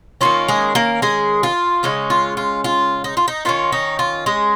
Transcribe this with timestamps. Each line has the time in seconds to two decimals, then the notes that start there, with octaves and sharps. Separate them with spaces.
0.21 D#3 A#3 C#4 F4
0.48 G#3 G#4
0.75 A#3 A#4
1.02 G#3 G#4
1.43 F4
1.83 C#3 G#3 C#4 D#4
2.10 F4
2.37 F4
2.64 F4
3.04 D#4
3.17 F4
3.28 D#4
3.45 D#3 A#3 C#4 F4
3.72 D#4
3.99 F4
4.26 G#3 G#4